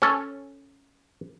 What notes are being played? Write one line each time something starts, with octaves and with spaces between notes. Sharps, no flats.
C#4 A4